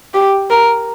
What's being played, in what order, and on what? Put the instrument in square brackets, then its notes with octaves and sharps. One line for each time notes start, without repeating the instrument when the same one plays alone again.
[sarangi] G4
A#4